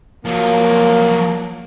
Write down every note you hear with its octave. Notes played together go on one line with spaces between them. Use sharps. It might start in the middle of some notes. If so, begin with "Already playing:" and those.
F3 F#3 A#3